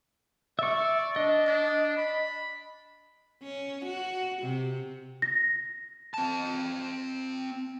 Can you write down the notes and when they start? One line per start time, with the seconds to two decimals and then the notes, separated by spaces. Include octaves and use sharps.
0.59 D5 E5 C#6
1.16 D4 D#5
1.46 D4
1.97 B5
3.43 C#4
3.86 F#4
4.43 C3
5.22 A#6
6.14 C4 A5